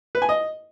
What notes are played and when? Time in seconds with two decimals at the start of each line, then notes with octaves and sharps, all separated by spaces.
0.15 B4
0.22 G#5
0.29 D#5